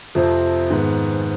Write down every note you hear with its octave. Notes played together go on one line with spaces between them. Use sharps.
F2 C3 F3 C4
G#2 D#3 B3